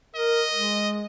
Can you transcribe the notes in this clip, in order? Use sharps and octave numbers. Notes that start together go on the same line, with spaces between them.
A#4 D#5
G#3